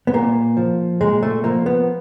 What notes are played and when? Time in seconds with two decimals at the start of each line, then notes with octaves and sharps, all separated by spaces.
0.07 B3
0.14 A#2 A#3
0.57 F3
1.01 A#2 G#3
1.23 A3
1.44 F3 A#3
1.66 B3